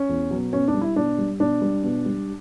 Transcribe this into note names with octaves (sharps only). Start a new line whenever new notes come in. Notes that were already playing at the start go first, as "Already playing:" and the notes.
Already playing: C#4
E2
B2 F#3
B2 C#4
D4
G3
E4
B2 D4
G3
B2 D4
G3
B2
G3